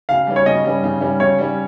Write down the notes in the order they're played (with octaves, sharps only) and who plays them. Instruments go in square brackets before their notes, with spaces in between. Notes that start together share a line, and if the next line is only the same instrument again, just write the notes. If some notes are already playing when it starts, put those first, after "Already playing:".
[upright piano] C#3 [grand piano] F5
[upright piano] G3 C#4
[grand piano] C#5
[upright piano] C#3 [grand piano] D#5
[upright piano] G3 C#4
C#3
G3 C#4
[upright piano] C#3 [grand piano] C#5
[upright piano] G3 C#4